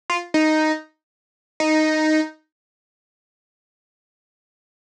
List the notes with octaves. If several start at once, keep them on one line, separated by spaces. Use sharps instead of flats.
F4
D#4
D#4